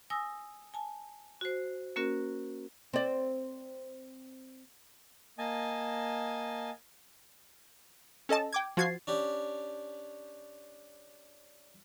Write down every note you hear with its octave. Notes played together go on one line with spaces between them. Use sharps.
G#5 D#6 E6 A#6
G#5 A5
F#4 C5
A#3 C#4 F#4 A#4
C4 D5
A#3 D#5 G#5 A5
C#4 A4 D#5 A5
G5 D6 G#6
F3 F#4 G#6 A6 C7
C#4 D4 G4